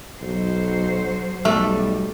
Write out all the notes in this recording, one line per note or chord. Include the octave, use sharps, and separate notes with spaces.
B1 F#3 C5
B1 G3 A3